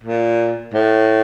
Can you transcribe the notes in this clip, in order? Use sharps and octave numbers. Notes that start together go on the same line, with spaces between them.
A#2
A2